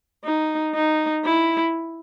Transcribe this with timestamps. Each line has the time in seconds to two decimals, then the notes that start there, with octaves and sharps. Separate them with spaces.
0.25 D#4
0.75 D#4
1.25 E4